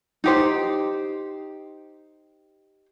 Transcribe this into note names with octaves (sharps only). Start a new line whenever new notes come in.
D#4 G4 C5